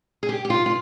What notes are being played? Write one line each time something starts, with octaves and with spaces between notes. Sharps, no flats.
G#4
G4
G4
F4
F4